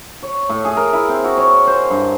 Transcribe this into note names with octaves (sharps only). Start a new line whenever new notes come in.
C#5
A2
G#4
A#4
E4
C4
F#4
C#5
C5
G2